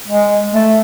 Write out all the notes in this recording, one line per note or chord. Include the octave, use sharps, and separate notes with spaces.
G#3
A3